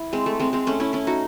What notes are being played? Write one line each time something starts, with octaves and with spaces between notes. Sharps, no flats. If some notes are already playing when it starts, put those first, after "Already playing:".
Already playing: E4
G#3 C4
A3
G#3 C4
G#3 C4
A3 C#4
C#4 E4
C#4 E4
D#4 F#4